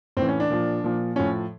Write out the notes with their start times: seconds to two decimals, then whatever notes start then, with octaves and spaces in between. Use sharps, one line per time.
0.17 A2 C4
0.22 E3
0.28 C#4
0.40 D4
0.50 A#2 F3
0.84 A#2 F3
1.16 A2 F3 C#4